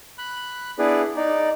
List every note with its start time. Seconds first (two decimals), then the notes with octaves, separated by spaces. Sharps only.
0.18 B5 F#6
0.79 B3 D4 E4 G#4 B4 D5
1.16 D#4 D5